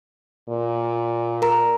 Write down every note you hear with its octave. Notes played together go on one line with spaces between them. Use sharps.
A#2
A#4 A#5